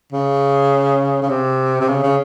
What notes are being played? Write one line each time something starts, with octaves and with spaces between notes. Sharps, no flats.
C#3
C#3
C3
C3
C#3
C#3